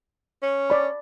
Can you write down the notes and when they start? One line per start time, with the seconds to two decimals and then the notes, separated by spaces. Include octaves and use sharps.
0.43 C#4
0.70 D5 B5